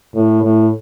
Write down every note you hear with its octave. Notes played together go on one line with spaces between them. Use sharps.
A2
A2